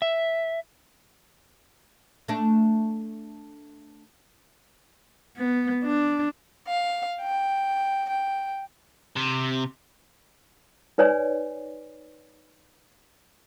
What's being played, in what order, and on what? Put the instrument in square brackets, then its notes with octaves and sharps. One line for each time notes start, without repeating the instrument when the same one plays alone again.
[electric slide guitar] E5
[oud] A3 D4
[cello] B3
D4
[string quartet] F5
G5
G5
[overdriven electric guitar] C3
[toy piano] D#4 B4 C#5 D5 G#5